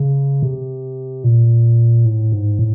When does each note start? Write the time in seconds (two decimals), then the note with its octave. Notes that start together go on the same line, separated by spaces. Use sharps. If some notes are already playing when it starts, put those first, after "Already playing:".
Already playing: C#3
0.42 C3
1.24 A#2
2.06 A2
2.32 G#2
2.59 A2